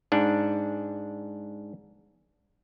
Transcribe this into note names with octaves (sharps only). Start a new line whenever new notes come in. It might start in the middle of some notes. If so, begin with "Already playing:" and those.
G#2 D4